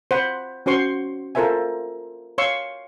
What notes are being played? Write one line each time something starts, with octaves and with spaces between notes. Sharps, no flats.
C5 F#5 B5
C#4 F#4 C5 C6 C#6
F4 A4 A#4 C5 E5 G#5
C#5 F5 C6 C#6 E6